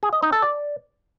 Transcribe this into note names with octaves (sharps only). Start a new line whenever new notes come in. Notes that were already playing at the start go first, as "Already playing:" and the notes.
G#4
D#5
D#4
A4
D5